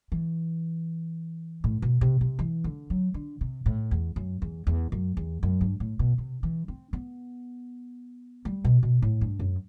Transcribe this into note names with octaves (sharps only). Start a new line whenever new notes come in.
E3
A2
B2
C3
C3
E3
D3
F#3
D3
C3
A2
E2
F#2
E2
E2
F#2
E2
F#2
G2
A2
B2
C3
E3
C4
B3
G3
B2
B2
A2
G2
F#2